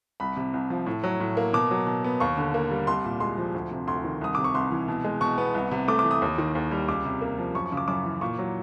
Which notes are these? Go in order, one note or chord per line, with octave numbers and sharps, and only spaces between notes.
C2 B5
C3
C2
F3
A2
F#3
A2
A#3
B2 D6
F#3
B2
B3
D#2 C#6
D3
A#3
G3
C2 C6
A#2
G#3 C6
F3
D2
C3
D2 C6
D#3
C2 D#6
C3 D6
C#6
C2 C6
E3
B2
G#3
B2 C#6
B3
C2
C3
A3 D6
D6
E3
D#6
D#2
D#3
D#2
G3
C#2 D6
C3
A#3
F3
F#2 C#6
C#6
C#3
D6
F#2 D6
E3
A#2 C#6
F#3